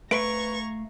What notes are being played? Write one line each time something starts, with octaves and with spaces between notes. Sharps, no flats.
A3 B4 E5 F5 A#5 C#6 G#6 D7